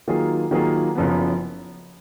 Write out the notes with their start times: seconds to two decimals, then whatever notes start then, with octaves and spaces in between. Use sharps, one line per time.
0.08 D#3 F#3 A#3 F4 G#4
0.51 D#3 F#3 A#3 F4 G#4
0.95 F#1 F#2 F3 B3